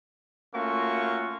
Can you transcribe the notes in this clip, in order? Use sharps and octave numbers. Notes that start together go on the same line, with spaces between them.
A3 A#3 C#4 F4 F#4 C#6